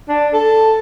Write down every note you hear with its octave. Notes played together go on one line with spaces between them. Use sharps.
D4
A4